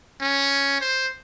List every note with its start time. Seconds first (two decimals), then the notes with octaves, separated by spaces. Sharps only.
0.21 C#4
0.81 C5